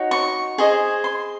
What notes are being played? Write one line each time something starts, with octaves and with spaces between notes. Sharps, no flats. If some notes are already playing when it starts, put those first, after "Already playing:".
Already playing: D#4 F#4 C#5
C#6
G#4 C5 D#5
C6